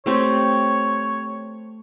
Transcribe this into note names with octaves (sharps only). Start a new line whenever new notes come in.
A3 C4 G4 C#5